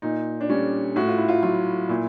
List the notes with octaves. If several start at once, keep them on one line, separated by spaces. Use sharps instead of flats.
A#2 D#4
D4
G3 C#4
A2 F#4
F4
E4
F4
F#3 F4
A#2 E4